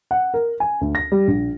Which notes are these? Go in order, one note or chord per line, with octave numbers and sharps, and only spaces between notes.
F#5
A#4
G#5
D2
A#6
G3
A#1